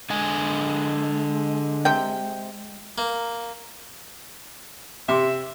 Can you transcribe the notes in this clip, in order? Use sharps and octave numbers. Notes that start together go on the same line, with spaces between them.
D3 G#3 D#5 G#5
C3 G5
A#3
C3 E5 C6 D6